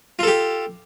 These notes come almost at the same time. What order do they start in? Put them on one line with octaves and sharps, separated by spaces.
F4 A4 G4